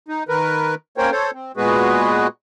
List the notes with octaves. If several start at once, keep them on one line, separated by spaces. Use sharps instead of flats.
D#4
D#3 A#4 B4
A#3 C#4 A#4 C5 C#5 G5
A4 C5 C#5
C4
A#2 G#3 B3 F#4 G#4 B4